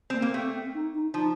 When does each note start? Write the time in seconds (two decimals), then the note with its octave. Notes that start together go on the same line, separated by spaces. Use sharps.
0.10 A#3 C4
0.22 A#3
0.34 A3 C4
0.54 C4
0.74 D#4
0.94 D#4
1.14 F3 D#4